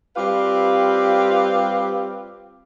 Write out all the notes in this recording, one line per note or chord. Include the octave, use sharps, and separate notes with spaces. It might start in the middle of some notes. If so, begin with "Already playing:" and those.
G3 C4 F4 G4 B4 F5